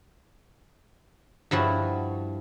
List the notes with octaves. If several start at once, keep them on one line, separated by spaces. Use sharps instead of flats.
G2 F3 E4 F#4